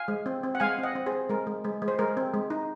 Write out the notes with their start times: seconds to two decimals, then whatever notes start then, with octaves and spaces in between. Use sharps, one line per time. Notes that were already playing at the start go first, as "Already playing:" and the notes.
Already playing: F5 G#5
0.08 G#3
0.26 C4
0.43 C4
0.55 F#5
0.60 G#3 F5 G#5
0.78 C4
0.83 D#5 F#5
0.95 C4
1.06 G#4 C5
1.12 C4
1.29 G#3 A#4
1.47 G#3
1.64 G#3
1.82 G#3
1.88 C5
1.99 G#3 A#4
2.17 C4
2.34 G#3
2.50 D#4